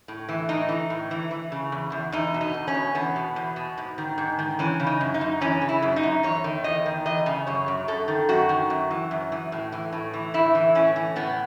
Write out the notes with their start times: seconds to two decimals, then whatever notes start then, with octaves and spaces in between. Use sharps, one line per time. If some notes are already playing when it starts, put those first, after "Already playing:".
0.08 A2
0.29 E3
0.49 A2 D#4
0.69 E3
0.90 A2
1.11 E3
1.31 E3
1.52 C#3
1.72 E2
1.92 E2
2.12 E2 D#4
2.34 B2
2.41 D#4
2.54 E2
2.68 C#4
2.75 B2
2.95 E2 B3
3.16 B2
3.36 E2
3.56 B2
3.78 G#2
3.98 D#3
4.18 G#2
4.39 D#3
4.59 E3 C#4
4.80 C#3
4.87 D#4
5.01 F#2
5.14 D#4
5.21 F#2
5.41 E3 C#4
5.61 C#3
5.69 E4
5.82 F#2
5.96 D#4
6.03 F#2
6.23 E2 C#5
6.44 D#3
6.64 E2 D#5
6.86 D#3
7.06 E3 D#5
7.26 C#3
7.47 F#2 C#5
7.68 F#2
7.88 F#2 A4
8.08 D#3
8.29 F#2 F#4
8.49 D#3
8.70 F#2
8.91 E3
9.11 F#2
9.32 E3
9.52 A2
9.72 E3
9.93 A2
10.13 E3
10.34 A2 E4
10.55 E3
10.75 A2 C#4
10.96 E3
11.16 A2 B3